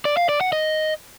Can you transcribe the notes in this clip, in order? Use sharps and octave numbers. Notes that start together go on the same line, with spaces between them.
D5
F5
D5
F#5
D#5